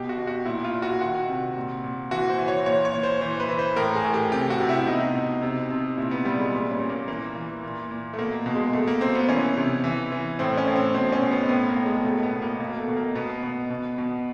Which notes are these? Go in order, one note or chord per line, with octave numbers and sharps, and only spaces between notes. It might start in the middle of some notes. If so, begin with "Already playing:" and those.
Already playing: B2 G4
F#4
B2
F#4
A#2 E4
F4
A#2
F#4
D#3 F#4
C3
A#2
A#2
E3 F#4
C5
E3
C#5
A#2 C#5
C#5
A#2
C5
E3 C5
B4
E3
C5
A2 A#4
G#4
A2
G4
C3 G4
F#4
C3
E4
B2 D#4
B2
C3
C3
A#2 E4
B3
A#2 G3
G#3
A#2 G3
C#4
A#2
A#3
E3 A#3
E3
A#2
A#2
A3
B2 A#3
B2
G#3
B2 A3
A#3
B2 C4
B3
E3 C#4
C3
E3
E3
A2 C4
C#4
A2
C4
B2 C4
C#4
B2
B3
C4
A2 B3
A#3
A2
G#3
B2 A3
B3
B2
A#3
B2 A#3
A3
B2
A#3
B2 B3
B2
B2
B2